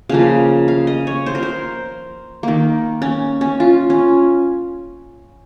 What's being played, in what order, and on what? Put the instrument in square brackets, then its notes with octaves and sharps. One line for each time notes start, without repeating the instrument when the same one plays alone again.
[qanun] C#3 F3 A#3 F5
F5
D#5
C#5
C5
A#4
C5
D#3 A#3
C#4
C#4
F4
C#4